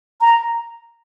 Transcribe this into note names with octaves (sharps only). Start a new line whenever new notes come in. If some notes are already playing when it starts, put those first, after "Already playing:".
A#5